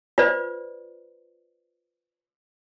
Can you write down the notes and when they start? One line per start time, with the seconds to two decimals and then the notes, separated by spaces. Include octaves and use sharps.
0.18 F4 B4 C5 D5